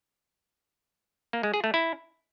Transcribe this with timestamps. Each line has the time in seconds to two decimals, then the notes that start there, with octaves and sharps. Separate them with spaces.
1.33 A#3
1.43 G#3
1.54 G#4
1.64 A3
1.74 E4